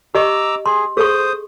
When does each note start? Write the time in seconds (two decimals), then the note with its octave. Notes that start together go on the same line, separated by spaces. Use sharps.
0.15 G4 D#5 A#5 C#6 D6 E6
0.66 G#4 C6
0.97 G#4 A4 C5 C#6 D#6